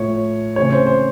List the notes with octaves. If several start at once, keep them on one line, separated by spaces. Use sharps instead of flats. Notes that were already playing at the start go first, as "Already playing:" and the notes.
Already playing: A2 F3 A3 C#5
C#3 E3 A3 C4 C#5
C5
C5